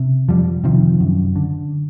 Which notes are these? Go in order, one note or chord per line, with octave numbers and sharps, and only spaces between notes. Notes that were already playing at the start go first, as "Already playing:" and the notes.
Already playing: C3
F2 F3 G3
C3 D#3 F3
F#2
D3